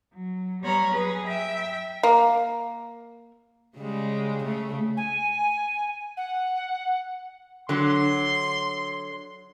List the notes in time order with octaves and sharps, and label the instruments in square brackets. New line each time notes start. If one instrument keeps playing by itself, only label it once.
[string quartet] F#3
G3 B3 C#5 A#5 B5 F6
F#3 G#4 B4
E5 G5
[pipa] A#3
[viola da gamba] C#3 G3 G#3
C#3 A3
[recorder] G#5
F#5
[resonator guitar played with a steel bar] D3 F#3 [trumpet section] C6